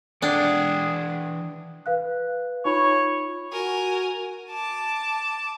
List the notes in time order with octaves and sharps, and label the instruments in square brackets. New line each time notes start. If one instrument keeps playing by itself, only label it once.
[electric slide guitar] E3 F#5 G5 [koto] D4 [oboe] G#4
[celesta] B4 F5 F#6
[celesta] D#4 F4 B5 [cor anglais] C#5
[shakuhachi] F#4 [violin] A#4 G#5
[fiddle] A5 D6